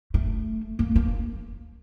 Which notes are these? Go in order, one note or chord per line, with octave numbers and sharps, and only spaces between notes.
A3
A#3
A#3